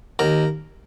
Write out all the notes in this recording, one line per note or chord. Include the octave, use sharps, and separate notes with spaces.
D#2 A#4